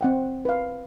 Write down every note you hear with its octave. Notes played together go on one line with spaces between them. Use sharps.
C4 F#5 G5
B4 F5